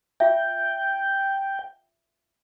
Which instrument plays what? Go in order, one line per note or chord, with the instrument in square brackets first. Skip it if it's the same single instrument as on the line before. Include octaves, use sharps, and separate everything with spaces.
[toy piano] F4 E5 [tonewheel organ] G5